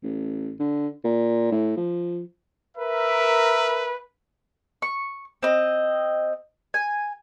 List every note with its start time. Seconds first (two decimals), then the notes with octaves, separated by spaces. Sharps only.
0.03 A1
0.59 D3
1.04 A#2
1.52 A2
1.77 F3
2.77 A#4 B4 E5
4.82 C#6
5.43 C4 D#5
6.74 G#5